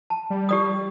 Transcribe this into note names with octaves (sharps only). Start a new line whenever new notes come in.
A5
G3
G4 D5 D#6